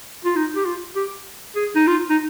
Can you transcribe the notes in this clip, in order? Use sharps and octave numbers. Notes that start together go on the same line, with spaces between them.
F4
D#4
G4
F4
G4
G#4
D#4
F4
D#4